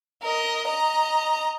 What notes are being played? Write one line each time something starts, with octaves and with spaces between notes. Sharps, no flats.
A#4 D#5
D#5 A#5